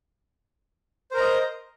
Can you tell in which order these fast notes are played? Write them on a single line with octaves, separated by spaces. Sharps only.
C5 A#4 A#5 D#5